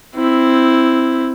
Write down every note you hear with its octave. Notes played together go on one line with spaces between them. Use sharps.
C4 E4